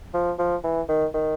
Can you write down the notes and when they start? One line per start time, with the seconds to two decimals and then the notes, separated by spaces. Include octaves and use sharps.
0.14 F3
0.39 F3
0.64 E3
0.88 D#3
1.14 D#3